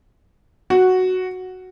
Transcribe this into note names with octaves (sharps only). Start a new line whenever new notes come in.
F#4